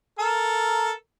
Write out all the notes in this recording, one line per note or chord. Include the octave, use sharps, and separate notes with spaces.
A4 A#4